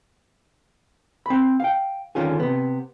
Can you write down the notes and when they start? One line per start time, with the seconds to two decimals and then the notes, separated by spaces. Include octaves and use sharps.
1.26 C4 B5
1.60 F5 G5
2.15 D3 D#3 C#4 F4 G#4
2.40 C3 B3